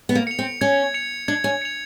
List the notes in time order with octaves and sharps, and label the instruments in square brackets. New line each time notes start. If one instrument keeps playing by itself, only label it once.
[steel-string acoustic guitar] B3
A#3
[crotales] C#7 F7
[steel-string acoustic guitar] C4
[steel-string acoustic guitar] C#4 [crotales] G#6
[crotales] C#7 F7
[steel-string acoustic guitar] D4 [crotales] G#6
[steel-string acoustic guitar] C#4
[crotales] C#7 F7